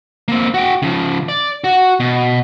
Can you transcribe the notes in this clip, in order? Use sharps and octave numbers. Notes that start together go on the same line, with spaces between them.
A#3 C4
F#4 G5
C#3 F3
D5
F#4
B2